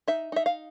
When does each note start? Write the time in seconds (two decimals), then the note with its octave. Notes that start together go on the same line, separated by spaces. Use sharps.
0.08 D#4 E5
0.32 D#4 E5
0.46 F5